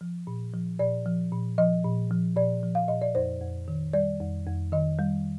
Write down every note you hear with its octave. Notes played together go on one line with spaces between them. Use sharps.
F3
A#2
F3
A#2 D5
F3
A#2
F3 D#5
A#2
F3
A#2 D5
F3
F5
A#2 D#5
D5
F2 C5
F2
D#3
G3 D5
F2
F2
D#3 D#5
G3